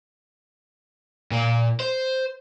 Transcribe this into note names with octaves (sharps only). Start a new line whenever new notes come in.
A#2 A#3
C5